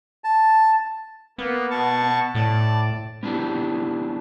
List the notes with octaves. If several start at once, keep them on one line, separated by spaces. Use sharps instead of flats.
A5
A#3 B3
B2 A5 C#6
A2 D5 A5
B3 C#4 D4 E4 G4